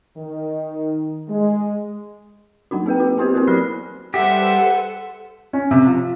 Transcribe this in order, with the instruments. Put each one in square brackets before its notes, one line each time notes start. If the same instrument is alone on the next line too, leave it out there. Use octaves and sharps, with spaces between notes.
[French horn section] D#3
G#3
[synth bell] F#3 A#3 D4 D#4 F#4
C4 G#4 B4 G5
F#4
B3 C4 E4 G4 B4 C5
B3 C4 E4 F#4 G4 A#4
F#3 D5 B5 F6 F#6 C7
[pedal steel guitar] G3 G4 [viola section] A4 B4 C5 [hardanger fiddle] E5 [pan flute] F#5
[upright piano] C#4
C3
F3